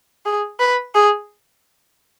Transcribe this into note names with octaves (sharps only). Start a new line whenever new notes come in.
G#4
B4
G#4